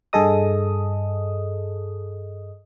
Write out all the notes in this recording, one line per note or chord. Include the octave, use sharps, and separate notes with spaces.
G2 G#4 A4 D#5 D#6